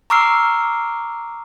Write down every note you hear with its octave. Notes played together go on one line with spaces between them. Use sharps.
A#5 C#6 D6 E6 F6 C7